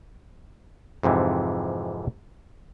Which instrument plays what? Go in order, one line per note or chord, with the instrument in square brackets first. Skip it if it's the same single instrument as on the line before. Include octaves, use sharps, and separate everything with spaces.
[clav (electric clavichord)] F2 G#2 C3 E3